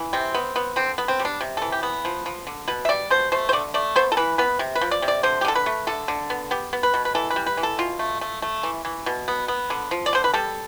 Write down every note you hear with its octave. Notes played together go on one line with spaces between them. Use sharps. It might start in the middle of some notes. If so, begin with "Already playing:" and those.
Already playing: E3
C3 C4
B3
B3
D3 C4
B3
C4
G3
D4
C3
E3 A4
G4
B3
F3
F3
D3
B2 B4
E5
G3 D5
B2 C5
A3 C5
C5
D3 D5
A3 D5
B3 C5
A4
E3 B4
B3 B4
C3
B4
F3
D5
C3
D5
D3 C5
G4
D3 A4
B4
A3
D3 A4
D3
B3
B3 G4
B3
B4
B2
B4
E3 A4
B4
G3
B4
E3
A4
B2 F4
A3
A3
A3
E3
E3
B2
B3
B3
D3
F3
D5
D3 C5
B4
G3 A4